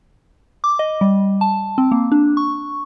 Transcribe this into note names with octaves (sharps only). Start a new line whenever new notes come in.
D6
D#5
G3
A5
C4
A#3
D4
C#6